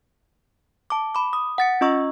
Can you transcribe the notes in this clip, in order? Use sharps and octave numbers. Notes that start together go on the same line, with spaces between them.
A5 D6
B5 D6
D#6
F#5 A6 C#7
C#4 F4 D#5 C#6 E6